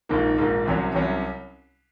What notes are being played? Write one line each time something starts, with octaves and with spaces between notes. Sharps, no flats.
A#1 G#2 D#3 A#3
A#1 G#2 D#3 A#3
C2 C3 F#3 C#4
C2 C3 F#3 C#4